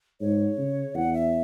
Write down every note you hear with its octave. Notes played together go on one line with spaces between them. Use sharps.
G#2 C#5
C#3
E2 F#5
E5